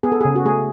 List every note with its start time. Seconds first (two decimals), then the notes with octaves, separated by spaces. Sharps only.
0.03 B3 G#4
0.12 A4
0.21 G#4
0.25 C#3
0.36 F#4
0.45 A3 G#4